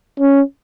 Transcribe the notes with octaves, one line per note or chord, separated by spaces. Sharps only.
C#4